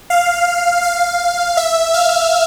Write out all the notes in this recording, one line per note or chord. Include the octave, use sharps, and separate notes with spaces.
F5
F5
E5
F5